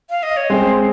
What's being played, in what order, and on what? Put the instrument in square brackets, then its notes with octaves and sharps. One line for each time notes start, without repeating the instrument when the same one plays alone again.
[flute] F5
D#5
C#5
[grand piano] G#3 C4 [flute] C5